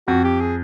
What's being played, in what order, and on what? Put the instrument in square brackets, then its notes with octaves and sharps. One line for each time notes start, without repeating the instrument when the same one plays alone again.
[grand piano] F2 [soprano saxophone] F#4
[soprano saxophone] G4
G#4